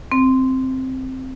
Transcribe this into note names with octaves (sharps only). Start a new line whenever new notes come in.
C4